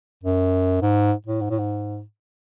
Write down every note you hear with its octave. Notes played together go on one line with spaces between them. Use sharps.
F#2
G#2
A2
G#2
A2
G#2